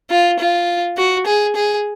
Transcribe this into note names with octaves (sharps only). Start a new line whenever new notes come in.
F4
F4
F#4
G#4
G#4